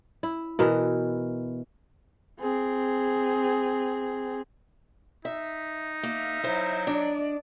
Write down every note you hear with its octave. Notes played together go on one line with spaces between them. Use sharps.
E4
B2 E3 A#4
C4 G#4
D#4 E5
A#3 E5 F5
F#3 E4 C5
D4 D5 D#5